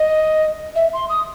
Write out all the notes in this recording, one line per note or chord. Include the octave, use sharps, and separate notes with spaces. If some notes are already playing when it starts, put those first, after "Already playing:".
Already playing: D#5
E5
C6
D#6